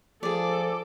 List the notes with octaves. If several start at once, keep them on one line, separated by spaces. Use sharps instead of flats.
F3 G#4 A4 D5 D6